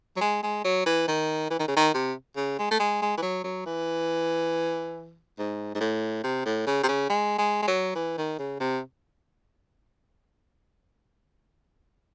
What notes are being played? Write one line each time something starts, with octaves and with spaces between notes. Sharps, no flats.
F#3
G#3
G#3
F#3
E3
D#3
E3
D#3
C#3
D#3
C3
C#3
G#3
A3
G#3
G#3
E3
F#3
F#3
E3
G#2
G#2
A2
C3
A2
C#3
C3
C#3
G#3
G#3
G#3
F#3
E3
D#3
C#3
C3